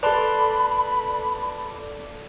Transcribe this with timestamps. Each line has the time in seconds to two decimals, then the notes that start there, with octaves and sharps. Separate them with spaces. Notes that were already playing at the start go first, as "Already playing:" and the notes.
0.03 A4 B4 D5 A5 B5 C6